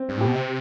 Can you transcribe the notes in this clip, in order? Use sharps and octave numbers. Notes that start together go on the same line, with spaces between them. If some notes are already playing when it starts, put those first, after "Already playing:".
Already playing: C4
G2
A2 G4
B2
C3